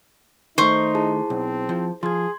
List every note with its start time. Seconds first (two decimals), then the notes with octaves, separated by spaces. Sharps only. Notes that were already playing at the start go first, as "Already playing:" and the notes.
0.58 D#3 A3 D#4 C5 C#6
0.95 E4 G#4 A5
1.30 B1 C4
1.69 F3
2.03 F3 G#4 C6 G#6